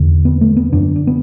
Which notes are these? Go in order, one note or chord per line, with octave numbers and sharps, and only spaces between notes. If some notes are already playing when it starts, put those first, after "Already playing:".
Already playing: E2 D3
B3
A3
B3
F#2 D3 D4
D4
B3